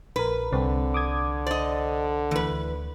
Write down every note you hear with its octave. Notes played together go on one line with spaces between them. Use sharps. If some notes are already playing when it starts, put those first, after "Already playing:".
A#1 A#4 B4
C2 D3 C4
D6 D#6 G#6
C5 D5 D#5
D2 E3 B4